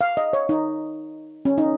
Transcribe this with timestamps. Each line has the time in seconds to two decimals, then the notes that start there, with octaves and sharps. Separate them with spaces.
0.01 F5
0.17 D#5
0.33 C#5
0.49 D#4
1.45 C#4
1.58 D#4